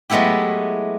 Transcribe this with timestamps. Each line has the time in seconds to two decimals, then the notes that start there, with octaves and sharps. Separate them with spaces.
0.10 F#3 G#3 A3 B3 E4 G4